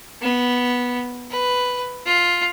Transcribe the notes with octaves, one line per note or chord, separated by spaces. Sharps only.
B3
B4
F4